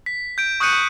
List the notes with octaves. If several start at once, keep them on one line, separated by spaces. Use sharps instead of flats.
B6
G6 D7
C#6 D#6 F#6 G6 C#7 D#7